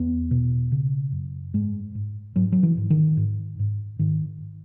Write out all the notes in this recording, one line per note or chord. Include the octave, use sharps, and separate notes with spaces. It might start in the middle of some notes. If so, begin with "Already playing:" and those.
Already playing: E2 B3
B2
C#3
F#2
G#2 G#3
G#2
G#2 F#3
F#3
E3
G#2
D#3
G#2
G#2
G#2 D#3